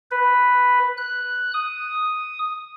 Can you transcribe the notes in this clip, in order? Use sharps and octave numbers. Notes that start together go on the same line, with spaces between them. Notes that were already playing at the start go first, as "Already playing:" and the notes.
B4
F#6
D#6